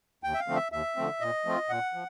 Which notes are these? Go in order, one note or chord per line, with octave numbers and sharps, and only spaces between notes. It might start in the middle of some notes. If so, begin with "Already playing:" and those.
D#2 G5
E5
F5
D3 F3 A3 C4
E5
D#2 E5
D3 F3 A3 C4
A#2 D#5
F3 A3 C4 F4
A#2 F#5
F3